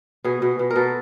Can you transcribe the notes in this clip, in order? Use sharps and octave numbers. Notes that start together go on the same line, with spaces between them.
B2 G#4
B2
B2
A#4
B2 A4